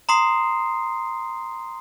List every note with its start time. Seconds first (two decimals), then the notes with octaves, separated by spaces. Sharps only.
0.09 A#5 C6 D#6 C7